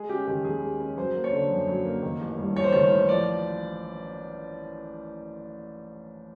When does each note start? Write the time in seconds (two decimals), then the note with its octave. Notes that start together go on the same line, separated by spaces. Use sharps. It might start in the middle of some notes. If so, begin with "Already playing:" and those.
Already playing: G#3 G#4
0.09 C#4 G4
0.27 D#3 G4
0.45 D#2 G#4
0.62 G#3
0.80 C#4
0.97 F#3 C5
1.15 A#3
1.24 C#5
1.33 D3
1.50 F#2
1.68 F#3
1.85 A#3
2.03 D#3
2.20 A1
2.38 G2
2.56 A1 C#5
2.64 C5
2.72 D#3 C#5
2.90 A1
3.09 F3 D5